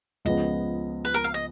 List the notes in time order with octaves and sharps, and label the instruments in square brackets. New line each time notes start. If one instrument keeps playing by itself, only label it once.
[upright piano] C#2 C#3 F3 B3 [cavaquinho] D#5
[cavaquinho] B4
A#4
F5
D#5